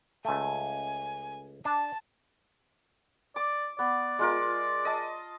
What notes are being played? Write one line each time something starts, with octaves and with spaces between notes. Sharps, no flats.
C#2 A3 G#5
D4 A5
D5 D6
B3 D5
G#3 F4 A#4
D#5 A5